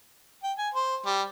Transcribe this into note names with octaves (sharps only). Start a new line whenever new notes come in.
G5
G#5
C5
G3